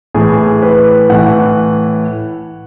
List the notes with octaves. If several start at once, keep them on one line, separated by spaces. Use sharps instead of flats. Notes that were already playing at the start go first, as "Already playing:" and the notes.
A2 E3 G#4
B4
A2 E3 F#5